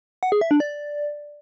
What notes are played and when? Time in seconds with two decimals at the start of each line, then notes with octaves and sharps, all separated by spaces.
0.23 F#5
0.32 G#4
0.41 E5
0.51 D4
0.60 D5